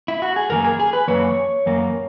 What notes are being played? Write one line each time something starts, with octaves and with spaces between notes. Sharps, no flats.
E4
F#4
G#4
F#2 E3 A#3 A#4
G#4
G#4
B4
F#2 E3 A#3 C#5
F#2 E3 A#3